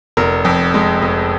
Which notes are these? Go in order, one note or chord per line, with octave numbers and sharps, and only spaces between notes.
F1 A#4
F2
G#3
F1